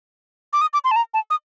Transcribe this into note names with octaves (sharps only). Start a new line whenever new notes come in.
D6
D#6
D6
C6
A5
A#5
A5
D#6